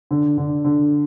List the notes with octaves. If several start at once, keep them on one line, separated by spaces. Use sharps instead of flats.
D3
D3
D3